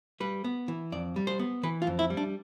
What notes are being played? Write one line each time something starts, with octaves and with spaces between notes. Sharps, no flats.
G3 B4
B3
E3
F2 D5
G3
C5
B3
E3 B4
F4
F2
E4
G3
D4